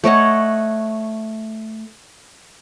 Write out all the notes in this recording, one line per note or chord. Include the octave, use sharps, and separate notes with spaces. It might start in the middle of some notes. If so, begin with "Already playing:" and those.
A3 C#5 D#5 F#5